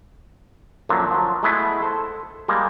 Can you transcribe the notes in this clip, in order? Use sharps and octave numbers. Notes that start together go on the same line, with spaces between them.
F#2 A#2 D3 F3 F#3
F3 F#3
G#3 A3 B3 E4 G#4 B4
A4 C5
G3 G#3 A#3